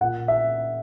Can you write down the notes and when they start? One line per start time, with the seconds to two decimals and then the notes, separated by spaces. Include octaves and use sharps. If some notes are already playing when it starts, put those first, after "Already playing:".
0.01 A#2 F#5
0.28 E5